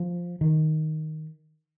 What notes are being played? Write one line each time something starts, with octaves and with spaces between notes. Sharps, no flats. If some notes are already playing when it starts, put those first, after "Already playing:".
Already playing: F3
D#3